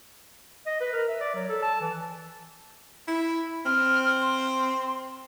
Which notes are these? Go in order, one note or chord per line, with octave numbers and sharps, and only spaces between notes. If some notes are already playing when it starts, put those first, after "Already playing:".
D#5
B4
A#4
E5
D5
F#3
A4
A5
E3
E4
C4 F6
C6